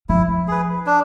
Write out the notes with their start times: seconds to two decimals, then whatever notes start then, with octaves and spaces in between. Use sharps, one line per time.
0.09 F3 E4
0.48 G#4 B4
0.86 D4